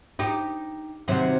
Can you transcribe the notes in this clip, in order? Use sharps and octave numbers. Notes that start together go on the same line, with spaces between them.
D#4 G4
D#2 C3 F#3